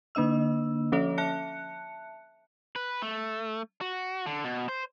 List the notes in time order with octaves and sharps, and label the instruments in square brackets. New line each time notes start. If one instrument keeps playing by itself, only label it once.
[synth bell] D3 A#3 D4 D#5 E6
F3 C#4 A4 C#5 E5
E5 A5 F#6 C#7
[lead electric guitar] B4
A3
F#4
D3
B2
C5